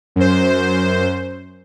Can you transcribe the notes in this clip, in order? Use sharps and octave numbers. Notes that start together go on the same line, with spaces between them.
F#2 C5